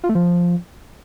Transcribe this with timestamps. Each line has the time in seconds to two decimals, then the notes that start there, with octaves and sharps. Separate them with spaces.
0.04 F4
0.09 A3
0.15 F3